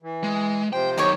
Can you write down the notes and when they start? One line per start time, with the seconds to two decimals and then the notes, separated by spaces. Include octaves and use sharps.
0.02 E3
0.23 G#3
0.73 C3 F3 C5 G5
0.98 F#2 D#3 D#4 G4 C#5